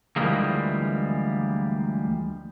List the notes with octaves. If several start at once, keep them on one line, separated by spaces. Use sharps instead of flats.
D2 E3 F3 G3 G#3 A#3